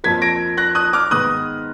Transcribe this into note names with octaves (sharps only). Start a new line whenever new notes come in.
F2 F3 A#3 G#6 B6
A#6 D7
F#6 A#6
D#6 F#6
D6 F6
G#2 D#3 G#3 B3 D#6 F#6